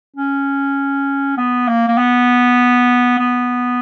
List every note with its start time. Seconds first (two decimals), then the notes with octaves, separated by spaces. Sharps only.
0.17 C#4
1.38 B3
1.68 A#3
1.88 A#3
1.98 B3
3.18 B3